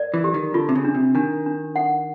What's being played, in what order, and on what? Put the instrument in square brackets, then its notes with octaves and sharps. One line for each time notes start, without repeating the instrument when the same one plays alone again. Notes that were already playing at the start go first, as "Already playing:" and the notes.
Already playing: [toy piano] A#4 D5
[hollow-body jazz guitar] E3
[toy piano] G4
[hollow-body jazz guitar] D#3
[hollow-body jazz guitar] D3 [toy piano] F4
[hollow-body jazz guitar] C3
C#3
[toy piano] D4
[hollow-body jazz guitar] C3
[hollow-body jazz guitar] D#3 [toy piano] D4
[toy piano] D4
F#5